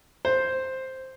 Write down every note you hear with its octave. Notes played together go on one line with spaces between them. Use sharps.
C5